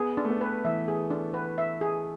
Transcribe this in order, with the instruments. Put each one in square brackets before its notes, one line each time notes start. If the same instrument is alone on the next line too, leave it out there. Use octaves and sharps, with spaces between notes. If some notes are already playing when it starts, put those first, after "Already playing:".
Already playing: [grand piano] B3 [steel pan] G#4
[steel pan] D4
[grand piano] A3
B3
[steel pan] B4
[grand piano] E3 [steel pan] E5
[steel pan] G#4
D4
B4
E5
G#4